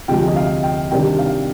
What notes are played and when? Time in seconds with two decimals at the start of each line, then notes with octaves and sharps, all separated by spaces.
0.08 D2 C3 F3 G#3 G5
0.28 D#5
0.36 F5
0.63 G5
0.91 C3 D#3 G3 D4 G5
1.19 F5